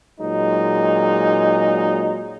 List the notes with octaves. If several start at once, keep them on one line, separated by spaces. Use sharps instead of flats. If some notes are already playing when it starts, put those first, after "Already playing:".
A#2 F#3 G#3 D#4